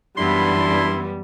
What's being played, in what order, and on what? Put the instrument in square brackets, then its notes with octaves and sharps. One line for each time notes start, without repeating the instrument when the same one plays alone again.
[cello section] F#2 E3 B3 [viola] G3 [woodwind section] D4 E4 [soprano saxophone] C6